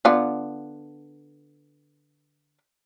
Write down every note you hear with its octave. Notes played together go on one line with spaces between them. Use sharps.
D3 B3 F4